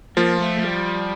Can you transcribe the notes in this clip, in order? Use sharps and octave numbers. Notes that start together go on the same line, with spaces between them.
F3 A#3 F4
A3
A3
G3